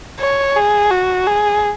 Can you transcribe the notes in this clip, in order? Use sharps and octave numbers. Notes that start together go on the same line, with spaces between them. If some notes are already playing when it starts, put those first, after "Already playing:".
C#5
G#4
F#4
G#4